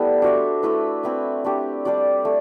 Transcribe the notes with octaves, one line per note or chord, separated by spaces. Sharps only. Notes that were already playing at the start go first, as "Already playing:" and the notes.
Already playing: G3 A3 B3 E4 A4 B4 E5
D4 F#4 C5 E5
A3 E4 B4
C4 E4 B4 E5
A3 D4 G4
G3 D4 G4 D5
A3